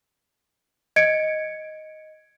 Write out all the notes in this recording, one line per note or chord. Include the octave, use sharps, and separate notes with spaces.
D#5 G#6 C#7 D7